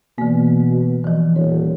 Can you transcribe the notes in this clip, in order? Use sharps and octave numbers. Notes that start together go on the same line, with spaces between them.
B2 E3 A#3
E3 F3
D#1 C#5